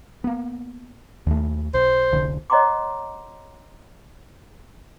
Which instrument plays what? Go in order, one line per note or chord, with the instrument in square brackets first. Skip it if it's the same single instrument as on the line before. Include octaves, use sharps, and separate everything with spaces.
[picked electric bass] A#3 B3
D#2 A3
[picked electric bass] B1 [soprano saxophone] C5
[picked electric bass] F1 C2 D3
[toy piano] C#5 D#5 F#5 A#5 C6 D6